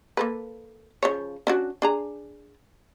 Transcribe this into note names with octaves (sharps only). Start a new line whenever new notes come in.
A#3 A4 B4
C#3 F3 C#5
C#4 D4 F#4
D4 G#4 A#5